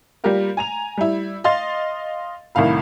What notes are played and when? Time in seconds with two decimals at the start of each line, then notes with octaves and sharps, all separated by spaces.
0.24 G3 A#3 F4 G4 A#4 F5
0.57 G#5 A#5 F7
0.97 G3 E4
1.44 D#5 F5 C6 A6
2.55 C2 A2 D#3 F5 B5